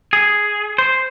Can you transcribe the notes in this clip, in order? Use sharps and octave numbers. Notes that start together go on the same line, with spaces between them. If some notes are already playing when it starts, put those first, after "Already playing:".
G#4
C5